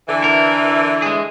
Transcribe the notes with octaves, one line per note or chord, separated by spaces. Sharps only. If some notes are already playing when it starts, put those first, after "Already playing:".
D3 E3
A#4
G#3 G#4